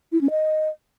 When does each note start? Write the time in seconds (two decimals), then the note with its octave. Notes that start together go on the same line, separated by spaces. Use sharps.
0.12 E4
0.21 C#4
0.30 D#5